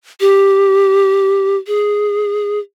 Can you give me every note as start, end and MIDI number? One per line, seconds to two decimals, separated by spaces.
0.20 1.56 67
1.67 2.59 68